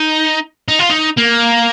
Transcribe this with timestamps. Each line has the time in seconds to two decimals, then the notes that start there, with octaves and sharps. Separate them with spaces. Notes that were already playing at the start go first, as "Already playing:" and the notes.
Already playing: D#4
0.68 D#4
0.79 F4
0.90 D#4
1.17 A#3